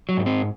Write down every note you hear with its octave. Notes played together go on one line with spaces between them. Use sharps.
F#3
G#2
C4